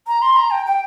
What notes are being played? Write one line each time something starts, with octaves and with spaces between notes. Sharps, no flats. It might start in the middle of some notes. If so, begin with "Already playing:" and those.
A#5
C6
A#5
G5
G5